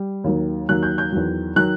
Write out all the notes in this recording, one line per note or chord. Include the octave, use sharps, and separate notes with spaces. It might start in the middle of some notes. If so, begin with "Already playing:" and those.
Already playing: G3
D#2 D#3 F#3
D#2 D#3 F#3 F#6
G6
G6
E2 D#3 F#3
D#3 F#3 F#6